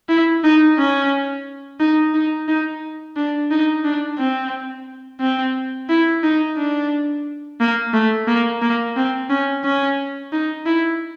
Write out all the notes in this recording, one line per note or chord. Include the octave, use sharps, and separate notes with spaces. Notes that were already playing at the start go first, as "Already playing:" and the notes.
E4
D#4
C#4
D#4
D#4
D#4
D4
D#4
D4
C4
C4
E4
D#4
D4
A#3
A3
A#3
A#3
C4
C#4
C#4
D#4
E4